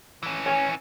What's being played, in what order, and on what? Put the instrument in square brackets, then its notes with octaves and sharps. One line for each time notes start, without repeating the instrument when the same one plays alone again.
[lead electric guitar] E3 C#4
[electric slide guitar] C#5 G#5